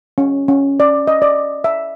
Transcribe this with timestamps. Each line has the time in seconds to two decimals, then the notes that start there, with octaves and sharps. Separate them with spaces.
0.18 C#4
0.48 C#4
0.80 D5
1.07 D#5
1.22 D5
1.64 E5